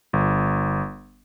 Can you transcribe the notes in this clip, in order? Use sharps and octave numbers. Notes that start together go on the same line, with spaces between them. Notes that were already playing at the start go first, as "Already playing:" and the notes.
G1